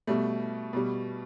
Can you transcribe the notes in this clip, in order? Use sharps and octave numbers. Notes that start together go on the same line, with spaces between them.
B2 G3 A3
B2 G3